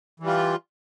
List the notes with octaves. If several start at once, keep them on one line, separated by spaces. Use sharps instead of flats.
E3 G3 F4